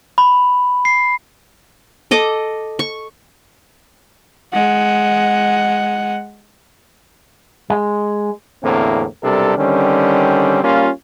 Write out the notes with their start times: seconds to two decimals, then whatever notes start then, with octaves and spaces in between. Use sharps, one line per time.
0.18 B5
0.85 C7
2.11 A4 D#5 D6
2.79 C#6
4.53 G#3 F#5
7.70 G#3
8.63 E2 A2 D3 A#3 C4
9.22 B1 C3 G3 D4 A4 A#4
9.57 D3 D#3 G3 C4 C#4
10.63 G3 A#3 C#4 F4